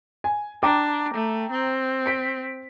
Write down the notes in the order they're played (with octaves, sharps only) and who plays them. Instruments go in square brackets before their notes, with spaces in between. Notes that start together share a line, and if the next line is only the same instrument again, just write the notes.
[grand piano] G#5
[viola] D4 [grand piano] G5 A#5 D6
[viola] A3
C4
[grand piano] B6 D7